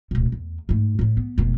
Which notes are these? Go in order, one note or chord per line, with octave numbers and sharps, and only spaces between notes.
D1 B2
E2
G#2 A3
A2 E4
B3
F1 B2